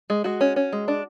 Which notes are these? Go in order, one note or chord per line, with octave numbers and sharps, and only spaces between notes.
G#3
G#3 F#4
C#4
C#4
G#3
D4